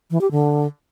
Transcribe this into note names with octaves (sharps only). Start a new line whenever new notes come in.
E3
G4
D3